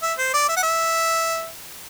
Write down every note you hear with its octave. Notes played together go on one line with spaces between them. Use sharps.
E5
C5
D5
E5
F#5
E5